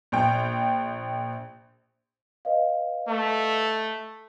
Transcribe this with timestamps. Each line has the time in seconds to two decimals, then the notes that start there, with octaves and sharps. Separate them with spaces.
0.12 A#1 G5
2.45 B4 D#5 F5
3.08 A3